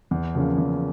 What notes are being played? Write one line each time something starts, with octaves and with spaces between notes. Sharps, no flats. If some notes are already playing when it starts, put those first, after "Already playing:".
E2
C#3 F3 A#3 C#4
E2